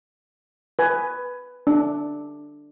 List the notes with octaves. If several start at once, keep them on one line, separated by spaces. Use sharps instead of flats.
B4 G#5
D4